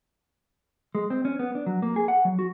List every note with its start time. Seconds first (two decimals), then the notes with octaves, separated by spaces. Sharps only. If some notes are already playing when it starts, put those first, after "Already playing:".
0.95 G#3
1.10 C4
1.25 C#4
1.39 B3
1.55 D4
1.66 F#3
1.82 A#3
1.96 G#4
2.08 F#5
2.25 F#3
2.39 F#4